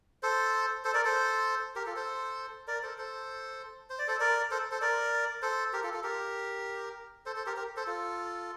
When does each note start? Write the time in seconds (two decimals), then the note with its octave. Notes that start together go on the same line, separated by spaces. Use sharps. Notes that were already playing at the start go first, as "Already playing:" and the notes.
0.23 A4 C5
0.84 A4 C5
0.94 A#4 D5
1.04 A4 C5
1.76 G4 A#4
1.86 F4 A4
1.96 A4 C5
2.67 A#4 D5
2.83 A4 C5
2.98 A4 C5
3.90 C5
3.99 D5
4.08 A4 C5
4.20 A#4 D5
4.51 A4 C5
4.71 A4 C5
4.81 A#4 D5
5.42 A4 C5
5.73 G4 A#4
5.83 F4 A4
5.93 F4 A4
6.03 G4 A#4
7.26 A4 C5
7.36 A4 C5
7.46 G4 A#4
7.56 G4 A#4
7.76 A4 C5
7.87 F4 A4